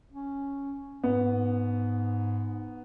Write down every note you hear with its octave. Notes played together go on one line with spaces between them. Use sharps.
C#4
G#2 B3